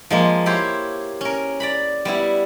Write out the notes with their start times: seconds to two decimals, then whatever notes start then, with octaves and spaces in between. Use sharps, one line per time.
0.10 F3 G#3 A#3
0.46 E4 G4 C5 C#5
1.21 C#4 A#4
1.60 D5 A#5 B5
2.05 G3 B3 E4